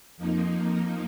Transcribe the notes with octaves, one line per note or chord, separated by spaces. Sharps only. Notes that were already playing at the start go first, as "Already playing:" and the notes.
F2 F3 A#3 D#4